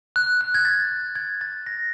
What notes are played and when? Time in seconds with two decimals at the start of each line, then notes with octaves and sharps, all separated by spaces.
0.16 F#6
0.41 F#6
0.54 G#6
0.65 A6
1.15 G#6
1.41 A6
1.67 A#6